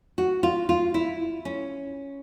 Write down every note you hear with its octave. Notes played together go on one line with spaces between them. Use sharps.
F#4
F4
F4
E4
C#4